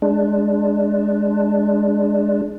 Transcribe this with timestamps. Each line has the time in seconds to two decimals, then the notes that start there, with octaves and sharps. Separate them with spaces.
0.02 G#3 D4